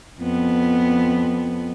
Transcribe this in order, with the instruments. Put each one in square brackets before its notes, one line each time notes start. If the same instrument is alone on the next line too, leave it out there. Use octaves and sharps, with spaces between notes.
[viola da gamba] F2 B3